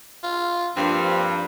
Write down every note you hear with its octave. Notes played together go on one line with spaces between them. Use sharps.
F4
G2 F3 A#3 C4 D4